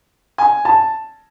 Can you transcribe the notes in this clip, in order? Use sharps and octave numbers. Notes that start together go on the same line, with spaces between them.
G#5
A5